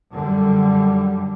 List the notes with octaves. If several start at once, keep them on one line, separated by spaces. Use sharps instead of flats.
F#2 D3 G3